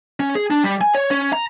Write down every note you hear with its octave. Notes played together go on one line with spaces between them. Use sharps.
C#4
G#4
D4
G3
G#5
C#5
C#4
A#5